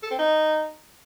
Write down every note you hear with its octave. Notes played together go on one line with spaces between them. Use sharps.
A4
C4
D#4